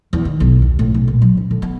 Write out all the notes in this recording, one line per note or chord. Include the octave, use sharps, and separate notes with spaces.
E2
D#3
B1
D#2
A2
B1
A#2
F#3
C#4
D3
B3